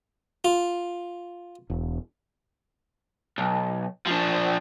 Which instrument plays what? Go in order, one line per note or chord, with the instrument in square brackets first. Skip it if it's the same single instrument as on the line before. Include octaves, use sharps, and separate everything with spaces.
[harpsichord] F4
[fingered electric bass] E1
[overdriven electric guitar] B1
F3 D4